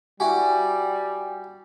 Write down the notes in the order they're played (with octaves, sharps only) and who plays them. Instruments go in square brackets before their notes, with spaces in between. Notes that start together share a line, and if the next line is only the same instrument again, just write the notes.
[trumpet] G3 [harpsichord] E4 F#4 G4 [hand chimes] G#5